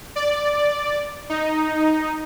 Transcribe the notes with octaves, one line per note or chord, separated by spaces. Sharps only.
D5
D#4